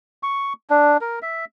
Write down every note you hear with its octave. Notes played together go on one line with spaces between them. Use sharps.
C#6
D4
A#4
E5